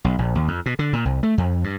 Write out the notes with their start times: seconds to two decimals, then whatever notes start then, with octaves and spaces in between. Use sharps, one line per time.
0.04 B1
0.18 A#1
0.35 D#2
0.48 F2
0.66 B2
0.79 D3
0.93 A#2
1.05 C2
1.23 A3
1.38 F2
1.64 G2